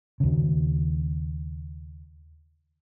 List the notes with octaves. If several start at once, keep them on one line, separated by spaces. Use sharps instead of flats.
D#2 C#3